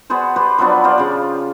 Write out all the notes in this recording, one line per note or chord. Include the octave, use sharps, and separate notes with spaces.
B3 F#4 G#4 C5
G4 B4 C5
F3 F#3 B3 D4
F4 G4 C5 D5
C#3 F3